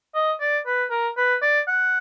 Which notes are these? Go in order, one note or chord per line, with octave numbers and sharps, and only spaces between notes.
D#5
D5
B4
A#4
B4
D5
F#5